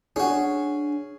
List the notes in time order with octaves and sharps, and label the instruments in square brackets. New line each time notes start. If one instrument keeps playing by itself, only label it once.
[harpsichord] C#4 F#4 [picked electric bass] D4 [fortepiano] G#4